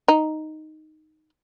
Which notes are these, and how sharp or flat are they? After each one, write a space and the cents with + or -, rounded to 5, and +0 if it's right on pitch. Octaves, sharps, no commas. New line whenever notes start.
D#4 +0